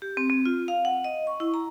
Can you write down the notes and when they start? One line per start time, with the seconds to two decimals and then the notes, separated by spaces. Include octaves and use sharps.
0.02 G4
0.17 C4
0.30 C4
0.45 F4
0.68 F5
0.85 F#5
1.04 D#5
1.27 C#6
1.40 E4
1.54 A#5